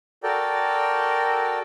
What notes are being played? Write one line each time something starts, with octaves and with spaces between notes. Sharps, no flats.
F#4 A4 A#4 D5 G5